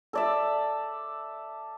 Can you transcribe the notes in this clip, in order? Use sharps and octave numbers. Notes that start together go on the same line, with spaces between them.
A4 D5 E5